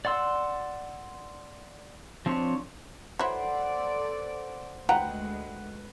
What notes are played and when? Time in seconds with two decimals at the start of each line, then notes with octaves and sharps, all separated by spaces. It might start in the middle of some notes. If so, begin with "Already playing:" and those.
0.05 D5 F#5 C6 E6
2.26 F3 C4 D4 C#5
3.19 F#3 E4 A4 B4 C5 D5 F#5
4.89 D2 G#3 B4 F#5 G5 A#5